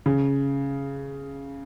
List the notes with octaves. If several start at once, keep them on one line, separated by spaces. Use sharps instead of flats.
C#3